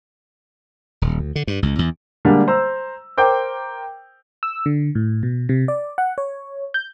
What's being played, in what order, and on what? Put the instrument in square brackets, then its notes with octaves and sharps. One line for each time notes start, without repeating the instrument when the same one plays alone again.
[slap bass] D#1
D2
D3
G2
C#2
E2
[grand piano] D3 G3 G#3 A#3 D4
C5 A#5 E6
A#4 C5 G5 D6 G6
[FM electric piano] E6
D3
A2
B2
C3
D5
F#5
C#5
G6